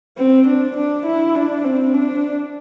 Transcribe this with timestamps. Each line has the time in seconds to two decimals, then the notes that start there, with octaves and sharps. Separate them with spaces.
0.18 C4
0.47 D4
0.77 D4
1.06 E4
1.35 D4
1.64 C4
1.94 D4